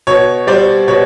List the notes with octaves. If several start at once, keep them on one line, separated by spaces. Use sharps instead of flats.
B2 C#5
G3 C5 D5
B2 C#5